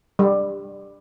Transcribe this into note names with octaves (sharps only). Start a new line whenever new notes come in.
G3